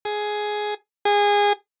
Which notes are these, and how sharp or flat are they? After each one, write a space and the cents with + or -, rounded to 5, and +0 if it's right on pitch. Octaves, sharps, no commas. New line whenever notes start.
G#4 +10
G#4 -20